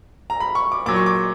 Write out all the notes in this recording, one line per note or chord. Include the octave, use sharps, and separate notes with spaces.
A#5
B5
C#6
D6
A#2 F#3 D6
C#6
D6